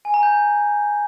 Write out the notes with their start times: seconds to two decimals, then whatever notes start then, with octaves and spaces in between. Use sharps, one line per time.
0.05 G#5
0.14 A#5
0.23 G6